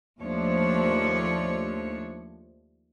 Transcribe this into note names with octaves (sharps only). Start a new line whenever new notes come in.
D#2 F3 A3 D4 C#5